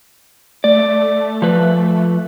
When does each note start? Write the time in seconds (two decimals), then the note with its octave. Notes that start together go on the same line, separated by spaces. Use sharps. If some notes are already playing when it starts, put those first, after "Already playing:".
0.64 A3 D5
1.42 F3 B4